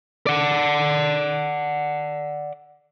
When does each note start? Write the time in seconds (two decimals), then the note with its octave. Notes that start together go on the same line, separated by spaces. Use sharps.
0.27 D5 F#5